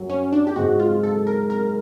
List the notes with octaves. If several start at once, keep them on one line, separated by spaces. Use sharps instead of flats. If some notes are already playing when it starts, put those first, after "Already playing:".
Already playing: F#2 F#3
C#4
D4
G4
G#2 G#3 F#4
F4
A4
A#4
A#4